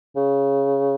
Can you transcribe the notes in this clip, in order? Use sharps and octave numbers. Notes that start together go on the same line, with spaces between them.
C#3